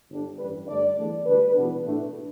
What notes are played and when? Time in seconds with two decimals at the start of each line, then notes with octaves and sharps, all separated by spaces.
0.10 G1 G2 D3 G3 D4
0.39 A1 G2 G3 B4
0.68 G2 D3 A3 D4 D5
0.97 E2 D3 A3 D4
1.27 D2 D3 G3 D4 B4
1.55 E2 B2 B3 D4
1.84 A2 A3 D4